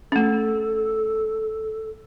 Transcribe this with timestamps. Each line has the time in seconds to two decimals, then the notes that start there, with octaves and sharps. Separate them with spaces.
0.12 A3 C#4 A4